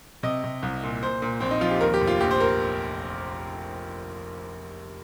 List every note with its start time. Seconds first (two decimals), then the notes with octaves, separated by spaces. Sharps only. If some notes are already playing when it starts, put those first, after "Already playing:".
0.23 C3 D#5
0.44 C3
0.62 C2
0.83 A#2
1.03 A#2 C5
1.22 A#2
1.40 A#1 C4
1.51 D#4
1.61 F3 F4
1.71 G4
1.81 D#2 A#4
1.94 G4
2.01 F1
2.07 F4
2.20 A#1 G4
2.31 C5
2.40 A#4